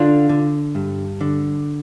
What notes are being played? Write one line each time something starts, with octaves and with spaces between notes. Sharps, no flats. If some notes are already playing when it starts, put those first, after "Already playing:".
Already playing: D3 D4 F4
D3
G2
D3